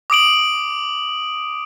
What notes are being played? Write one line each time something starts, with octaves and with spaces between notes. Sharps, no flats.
D6 D#6 D7 F#7